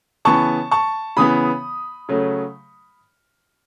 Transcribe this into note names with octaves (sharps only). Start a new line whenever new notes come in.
C#3 E3 B3 A5 C#6
A5 C#6
C#3 E3 B3 B5 D#6
C#3 F#3 A3